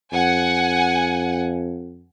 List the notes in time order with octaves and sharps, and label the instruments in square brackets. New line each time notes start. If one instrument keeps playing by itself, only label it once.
[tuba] F2 [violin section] F#5 G#5